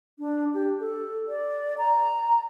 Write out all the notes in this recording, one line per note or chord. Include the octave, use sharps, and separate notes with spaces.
D4
G4
A4
D5
A#5